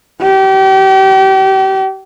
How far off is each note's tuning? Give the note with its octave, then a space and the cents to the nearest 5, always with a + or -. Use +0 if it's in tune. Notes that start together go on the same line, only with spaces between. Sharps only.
G4 -35